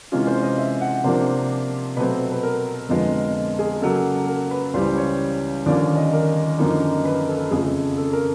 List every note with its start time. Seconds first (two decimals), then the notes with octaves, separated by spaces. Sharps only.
0.12 C3 E3 G#3 C#4 F4
0.27 C5
0.43 D#5
0.58 E5
0.81 F#5
1.04 C3 F3 A#3 D4 C5
1.97 B2 F#3 A3 C4 B4
2.32 B4
2.43 A#4
2.89 F2 D3 F3 G#3 B3
3.59 G#4
3.81 C#3 F#3 A#3 A4
4.27 A#4
4.51 B4
4.74 C#2 C#3 E3 G3 C5
4.97 C#5
5.66 D#2 D3 F3 A#3 C#4 D5
5.97 D#5
6.13 A#4
6.59 F#2 D3 F3 A#3 D#4
7.05 B4
7.28 A4
7.51 F2 C#3 F3 A3 G#4
7.97 A4
8.13 A#4